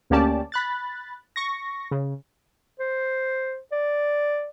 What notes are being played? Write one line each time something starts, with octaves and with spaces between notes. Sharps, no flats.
D2 A#3 C#4 G4 D5 A5
B5 F#6 A6
C#6 A#6
C#3
C5
D5